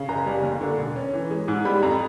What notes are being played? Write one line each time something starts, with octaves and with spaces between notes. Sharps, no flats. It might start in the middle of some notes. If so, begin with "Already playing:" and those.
Already playing: C#3
F#1 A#5
G3
D#2
D3
E1
C#4
E3
G#3
G#2
G3 B5
F2 A#5